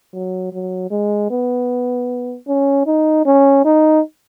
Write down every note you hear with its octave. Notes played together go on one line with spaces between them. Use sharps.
F#3
F#3
G#3
B3
C#4
D#4
C#4
D#4